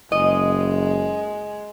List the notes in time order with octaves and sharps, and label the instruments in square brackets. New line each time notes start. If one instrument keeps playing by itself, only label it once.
[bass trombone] F#1 [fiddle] G#3 [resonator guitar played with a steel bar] D#5